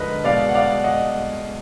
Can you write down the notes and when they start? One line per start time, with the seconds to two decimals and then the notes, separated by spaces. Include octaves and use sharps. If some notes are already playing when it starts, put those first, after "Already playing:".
Already playing: D3 F3 G#3 A#4 B4 D#5
0.24 B2 G#3 D5 F5
0.49 F#5
0.55 D5 F5
0.84 D#5 F#5